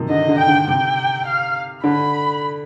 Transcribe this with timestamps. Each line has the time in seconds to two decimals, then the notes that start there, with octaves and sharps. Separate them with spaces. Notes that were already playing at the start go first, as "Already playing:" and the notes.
Already playing: C3 D#3 F3
0.10 D3 D#5
0.28 D3
0.38 G5
0.48 D3
0.67 C3 G5
1.26 F5
1.84 D3 B5